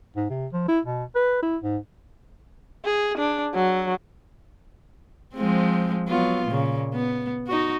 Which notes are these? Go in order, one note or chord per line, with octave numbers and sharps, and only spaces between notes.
G#2
C3
F3
E4
B2
B4
E4
G#2
G#4
D4
F#3
F3 G#3 C4
F#3 B3 F4
A#2 C#3
B3
D#4 F#4